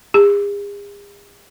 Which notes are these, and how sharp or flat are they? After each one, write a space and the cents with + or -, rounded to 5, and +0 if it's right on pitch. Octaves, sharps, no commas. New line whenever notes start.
G#4 -45